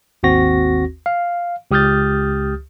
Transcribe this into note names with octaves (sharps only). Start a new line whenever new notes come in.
G#1 D#2 C4 F#4 A#6
F5
C#2 G4 D#6 F6 G6 A6